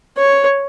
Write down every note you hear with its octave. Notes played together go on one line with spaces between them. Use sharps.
C#5